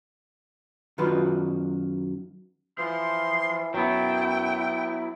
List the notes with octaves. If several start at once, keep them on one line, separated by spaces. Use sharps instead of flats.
F#2 D#3 F4 F#4 B4
E3 F3 C6
F#2 F#3 B3 E4 G5